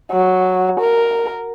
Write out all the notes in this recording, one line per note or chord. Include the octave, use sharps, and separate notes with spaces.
F#3
A#4